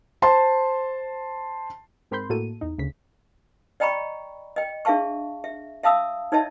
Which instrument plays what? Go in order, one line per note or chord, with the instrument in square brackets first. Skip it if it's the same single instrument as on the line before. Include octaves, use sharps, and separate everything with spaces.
[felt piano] C5 A5 C6
[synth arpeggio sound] G#2 C4 A#4 B5 C6 G6
A2 A#3 F#4 A4 D#7
E2 D#4
D2 C#3 B6
[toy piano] D5 D#5 G5 A#5 B5 C#6
D#5 G5
D4 G#4 E5 F5 A5 C#6
E5
E5 F5 A5 D#6 E6
D#4 C#5 D#5 E5 A5